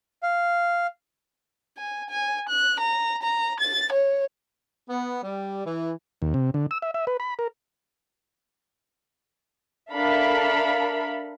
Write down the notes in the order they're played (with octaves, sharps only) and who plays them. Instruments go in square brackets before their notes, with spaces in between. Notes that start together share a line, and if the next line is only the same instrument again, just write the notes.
[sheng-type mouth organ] F5
[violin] G#5
G#5
F#6
A#5
A#5
A6
C#5
[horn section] B3
G3
E3
[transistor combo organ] D#2
C3
D3
E6
E5
E5
B4
B5
A#4
[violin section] D4 A4 A#4 E5 F5 B5